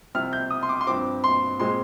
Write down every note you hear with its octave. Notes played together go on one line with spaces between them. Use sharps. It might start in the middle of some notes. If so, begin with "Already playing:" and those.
C2 C3 F3 F6
G6
D#6
C6
D6
C6
G2 F3 C4 D6
C6
A#2 G#3 C4 C6